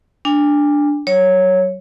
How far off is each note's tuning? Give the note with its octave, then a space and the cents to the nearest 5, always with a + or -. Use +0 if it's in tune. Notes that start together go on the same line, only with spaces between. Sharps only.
D4 +0 G#5 -45
F#3 +30 C#5 -5